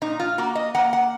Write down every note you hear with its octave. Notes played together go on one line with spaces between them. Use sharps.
A#2 D#4
F4
A#3 F#4
D#5
A#3 F#5
F#5